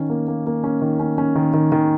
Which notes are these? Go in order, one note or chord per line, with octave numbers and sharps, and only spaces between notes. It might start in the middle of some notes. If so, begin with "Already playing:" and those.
Already playing: D#3 C#4
A#3
A#3
A#3
C#4
D#3
C#4
C#4
D#3
D#3
D#3